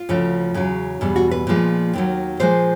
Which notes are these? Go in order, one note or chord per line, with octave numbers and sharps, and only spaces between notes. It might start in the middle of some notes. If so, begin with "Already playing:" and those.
Already playing: F4
D2 C#3 F3
E2 C#3 F#3
E2 B2 G3
F#4
B4
A#2 F3 G#3
D#2 D#3 F#3
A#2 F3 G#3 C5